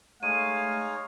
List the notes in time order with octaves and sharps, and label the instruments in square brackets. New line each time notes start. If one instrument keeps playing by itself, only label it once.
[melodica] G#3 D#4 C#5 [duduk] A3 [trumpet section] F5 [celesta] D#7